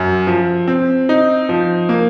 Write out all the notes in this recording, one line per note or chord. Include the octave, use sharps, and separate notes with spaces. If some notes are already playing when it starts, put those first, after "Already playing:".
Already playing: F#2
F3
C4
D#4
F3
A#3